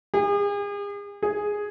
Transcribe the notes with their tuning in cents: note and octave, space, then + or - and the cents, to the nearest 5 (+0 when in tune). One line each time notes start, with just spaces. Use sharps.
G#4 -40
G#4 +0